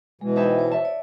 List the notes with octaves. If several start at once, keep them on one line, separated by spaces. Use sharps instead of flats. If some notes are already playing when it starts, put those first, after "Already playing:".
B2 E3 G#3
D#4 E4 C5 E5 G5 A5
C5 C#5
E5 A5
C#5 D5